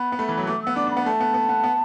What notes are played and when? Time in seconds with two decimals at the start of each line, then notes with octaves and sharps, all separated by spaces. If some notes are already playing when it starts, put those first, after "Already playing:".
Already playing: B3 B5
0.12 B3
0.19 A3
0.29 E3
0.37 F#3
0.47 A3 D6
0.62 B3 E6
0.76 D4 D6
0.87 D4
0.91 B5
0.97 B3
1.06 A3 A5
1.20 B3
1.34 B3
1.49 B3
1.64 B3